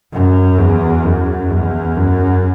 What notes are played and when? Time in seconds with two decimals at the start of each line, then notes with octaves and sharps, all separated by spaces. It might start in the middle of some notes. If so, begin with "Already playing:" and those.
0.13 F#2
0.59 E2
1.04 F#2
1.50 E2
1.96 F#2